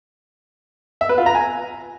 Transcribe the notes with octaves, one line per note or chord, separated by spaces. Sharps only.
E5
B4
F4
A#5
G#5